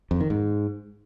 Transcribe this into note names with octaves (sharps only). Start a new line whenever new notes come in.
F2
D#3
G#2